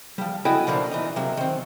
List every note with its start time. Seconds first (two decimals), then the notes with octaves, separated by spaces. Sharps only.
0.18 F3 G3
0.45 E4 F#4 A4 D#5 G5 G#5
0.67 B2 F3 A#3 D4
0.91 E3 D#4
1.16 C3 F#3 A#3
1.37 D#3 C4